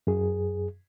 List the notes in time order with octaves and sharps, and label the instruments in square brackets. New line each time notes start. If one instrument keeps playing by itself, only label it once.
[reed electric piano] F#2 G#4